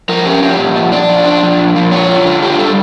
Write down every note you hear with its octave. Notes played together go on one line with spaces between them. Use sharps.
F3 A#4
C#4 G4
F3 G4
A#2
F3
D4 D5
F3
D4
F3
A#2
F3
F4 C#5
F4
D3
F4 G4
G3 A4